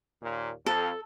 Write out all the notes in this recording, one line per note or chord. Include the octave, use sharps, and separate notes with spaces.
D#2 A#2
F2 A4